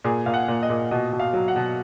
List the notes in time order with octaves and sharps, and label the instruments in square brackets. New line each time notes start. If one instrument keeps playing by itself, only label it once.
[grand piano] A#2 G#4
A#2 F5
F#5
A#2
D#5
A#2
B2 D#5
B2
F5
F#3
F#5
B2